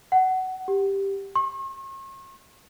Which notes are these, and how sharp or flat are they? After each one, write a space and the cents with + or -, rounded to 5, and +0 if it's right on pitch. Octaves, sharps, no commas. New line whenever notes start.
F#5 +20
G4 +5
C#6 -45